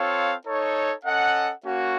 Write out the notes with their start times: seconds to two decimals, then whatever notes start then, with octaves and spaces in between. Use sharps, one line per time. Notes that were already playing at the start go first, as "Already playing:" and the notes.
Already playing: C4 F4 A4 C#5 F5
0.46 D#4 A4 C#5
1.05 C#4 A4 D#5 F#5
1.64 A#3 C#4 F#4